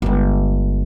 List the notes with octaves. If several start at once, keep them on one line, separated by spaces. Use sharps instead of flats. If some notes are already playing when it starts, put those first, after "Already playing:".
G1 G#3